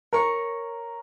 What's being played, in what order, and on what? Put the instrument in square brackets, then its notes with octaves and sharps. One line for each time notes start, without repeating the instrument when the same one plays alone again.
[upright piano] A#4 [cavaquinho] C#5 A#5 C#6